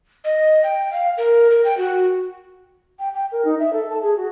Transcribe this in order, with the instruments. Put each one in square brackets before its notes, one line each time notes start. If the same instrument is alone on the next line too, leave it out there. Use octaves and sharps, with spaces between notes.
[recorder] D#5
G5
F5
A#4
A#4
G5
F#4
[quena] G5
G5
A#4
D#4
E5
A4
A5
G#4
F#4